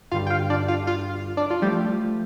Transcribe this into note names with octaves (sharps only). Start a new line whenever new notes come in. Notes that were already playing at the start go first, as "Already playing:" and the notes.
G2 D3 G3 F4 F5
G5
F4 F5
D4 D5
F4 F5
F4 F5
D4 D5
F4
F3 G3 A3 G4